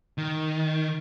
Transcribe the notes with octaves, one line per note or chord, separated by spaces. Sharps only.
D#3